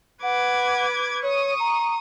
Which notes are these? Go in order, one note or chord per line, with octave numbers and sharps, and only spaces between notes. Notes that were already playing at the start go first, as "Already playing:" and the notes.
B4 F#5 D6 G#6
C#5 C#6 D#6
A#5